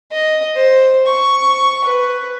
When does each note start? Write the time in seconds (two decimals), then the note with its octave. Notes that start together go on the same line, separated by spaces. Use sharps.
0.12 D#5
0.56 C5
1.07 C#6
1.85 B4